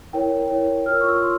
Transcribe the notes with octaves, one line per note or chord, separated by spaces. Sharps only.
E4 A#4 C#5 G5
E4 A#4 C#5
F4 A#4 C#5 F6
E6
C#6
E6
F4 C6